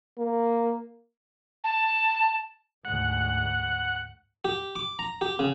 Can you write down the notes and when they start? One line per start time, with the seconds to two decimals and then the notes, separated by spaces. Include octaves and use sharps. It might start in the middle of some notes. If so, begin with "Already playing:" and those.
0.18 A#3
1.64 A5
2.85 D2 G#2 F#5
4.45 G4
4.75 D6
4.99 A#5
5.21 G4
5.39 C#3